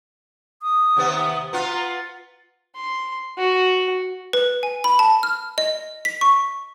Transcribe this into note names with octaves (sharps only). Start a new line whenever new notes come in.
D#6
D#2 C3 B3
B3 F4 A#5
C6
F#4
B4
G#5
B5
A5
F6
D#5
B6
C#6